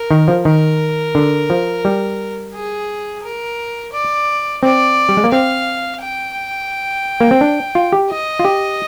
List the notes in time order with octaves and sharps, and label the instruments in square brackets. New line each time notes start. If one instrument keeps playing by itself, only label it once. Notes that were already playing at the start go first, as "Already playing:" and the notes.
Already playing: [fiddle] A#4
[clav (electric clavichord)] D#3
F3
[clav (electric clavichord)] D#3 [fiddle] A#4
[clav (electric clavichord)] D3
F3
G3
[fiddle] G#4
A#4
D5
[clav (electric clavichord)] C4 [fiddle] D5
[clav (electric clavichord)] G3
G#3
A#3
[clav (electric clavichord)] C4 [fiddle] F5
[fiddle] G5
[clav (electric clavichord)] A#3
C4
D4
F4
G4
[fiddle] D#5
[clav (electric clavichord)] F4
G4